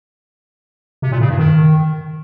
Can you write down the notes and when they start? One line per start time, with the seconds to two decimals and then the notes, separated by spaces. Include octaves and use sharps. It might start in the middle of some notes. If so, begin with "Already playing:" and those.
1.02 C3
1.11 A#2
1.21 C#3
1.30 G2
1.39 D#3